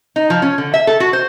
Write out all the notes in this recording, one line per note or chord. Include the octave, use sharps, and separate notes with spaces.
D#4
F3
C#4
D3
E5
A4
F#4
C5